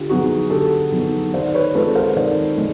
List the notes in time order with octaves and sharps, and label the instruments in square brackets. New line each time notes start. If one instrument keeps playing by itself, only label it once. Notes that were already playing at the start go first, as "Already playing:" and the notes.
Already playing: [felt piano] D3 [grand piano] F4 G4
[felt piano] F#3 B3 D#4 [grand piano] F#4 G#4
[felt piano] D3 [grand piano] G4 A4
[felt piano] F#3 B3 D#4
[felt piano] D#3 [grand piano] C5 D5
[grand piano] B4 C#5
[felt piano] G#3 C4 F4 [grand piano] A4 B4
[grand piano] A#4 C5
[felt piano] D#3 [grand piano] C5 D5
[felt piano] G#3